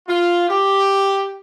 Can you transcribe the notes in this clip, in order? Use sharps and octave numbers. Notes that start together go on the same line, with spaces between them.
F4
G4